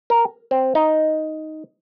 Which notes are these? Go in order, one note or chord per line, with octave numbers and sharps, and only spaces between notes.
A#4
C4
D#4